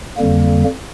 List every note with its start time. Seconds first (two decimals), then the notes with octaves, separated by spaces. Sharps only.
0.18 F2 D3 G3 A#3